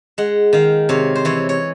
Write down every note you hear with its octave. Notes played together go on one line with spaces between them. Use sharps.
G#3 F#5
D#3 F5
C3 C#5
C5
E3 C#5
C#5